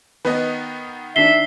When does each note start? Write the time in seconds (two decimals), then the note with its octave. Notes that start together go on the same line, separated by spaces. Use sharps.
0.25 D#3 B3 B4 D#5
1.16 D#3 D4 E5 C7 G7